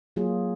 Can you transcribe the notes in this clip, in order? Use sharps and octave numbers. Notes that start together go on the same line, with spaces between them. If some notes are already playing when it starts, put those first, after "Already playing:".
F#3 A#3 F4 G#4